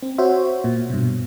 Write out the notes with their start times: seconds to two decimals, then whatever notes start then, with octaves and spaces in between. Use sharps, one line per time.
0.03 C4
0.18 F#4 C5 C#5 E5
0.64 A#2
0.90 G2 B2